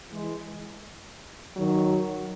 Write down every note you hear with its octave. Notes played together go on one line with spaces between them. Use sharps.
E3 G#3
D#3 F#3